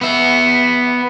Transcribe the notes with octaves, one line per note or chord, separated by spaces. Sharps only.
B3 E5